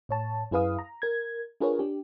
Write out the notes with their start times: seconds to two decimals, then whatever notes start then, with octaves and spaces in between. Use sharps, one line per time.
0.09 A2 C#5 A5
0.51 F#2 E4 G#4 B4 F5 D#6
0.79 A#5
1.02 A#4 G#6
1.61 D4 F4 G#4 A#4 B4 C#5
1.79 D4 G4